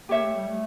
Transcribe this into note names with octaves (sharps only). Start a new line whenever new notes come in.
A#3 G4 C#5 E5
A3
G3
A3